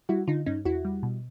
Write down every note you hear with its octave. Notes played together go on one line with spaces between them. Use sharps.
G3 E4 F#4
D3 D#4 F4
G2 C#4 D#4
E2 E4 F#4
G3
B2